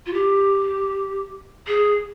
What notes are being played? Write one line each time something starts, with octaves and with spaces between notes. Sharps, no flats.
F4
G4
G#4